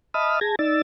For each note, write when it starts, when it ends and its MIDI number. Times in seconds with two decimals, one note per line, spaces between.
0.14 0.40 75
0.14 0.40 76
0.14 0.40 81
0.14 0.40 83
0.14 0.40 87
0.14 0.40 89
0.41 0.55 68
0.41 0.55 81
0.41 0.55 92
0.41 0.55 94
0.59 0.82 63
0.59 0.82 74
0.59 0.82 88
0.59 0.82 93